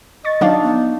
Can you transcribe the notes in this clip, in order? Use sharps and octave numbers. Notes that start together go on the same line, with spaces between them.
D#5 C#6 A6
F#3 D4 D#4 D5 F5
B3